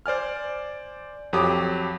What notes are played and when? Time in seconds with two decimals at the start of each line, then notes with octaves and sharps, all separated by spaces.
0.06 C5 D5 G#5 F6
1.33 F2 F#3 G4 D6 D#6